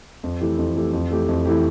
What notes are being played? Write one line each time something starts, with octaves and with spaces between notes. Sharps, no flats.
F2
E3 A3 E4 G4
F2
E3 A3 E4 G4
F2
E3 A3 E4 G4
F2
E3 A3 E4 G4